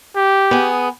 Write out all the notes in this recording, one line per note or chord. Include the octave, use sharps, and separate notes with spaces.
G4
B3 G#4